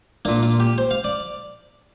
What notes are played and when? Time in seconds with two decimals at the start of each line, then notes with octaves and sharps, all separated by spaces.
0.25 A#2 A#3 D4
0.43 F4
0.60 G4
0.78 C5
0.91 F5
1.04 D5